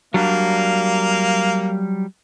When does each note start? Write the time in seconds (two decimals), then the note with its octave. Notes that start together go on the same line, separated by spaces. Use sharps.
0.14 F#3 G3 A#3 D4 F5